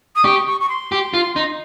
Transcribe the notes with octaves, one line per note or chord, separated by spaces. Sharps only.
D#6
G4 C#6
C#6
C#6
C6
G4
F4
D#4